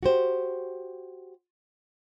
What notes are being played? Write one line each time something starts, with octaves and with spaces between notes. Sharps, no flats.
F#4 G4 C5